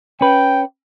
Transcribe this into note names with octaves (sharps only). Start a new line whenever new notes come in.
C#4 B4 G5